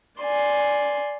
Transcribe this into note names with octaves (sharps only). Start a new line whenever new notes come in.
D5 G#5 C6